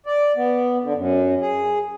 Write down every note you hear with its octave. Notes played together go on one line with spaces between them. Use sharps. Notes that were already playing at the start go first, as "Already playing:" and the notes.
D5
B3
D3
F#2
G#4